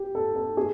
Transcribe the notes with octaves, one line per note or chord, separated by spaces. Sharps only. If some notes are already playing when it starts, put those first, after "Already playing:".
Already playing: G4
A4
A4
G#4